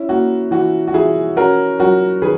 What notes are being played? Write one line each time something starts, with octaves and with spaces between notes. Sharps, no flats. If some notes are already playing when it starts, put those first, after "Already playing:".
Already playing: C#4 E4
A#3 F#4
E3 F#4
F#4
E3 E4 G#4
C#4 F#4 A#4
F#3 F#4 A#4
D#3 G#4 B4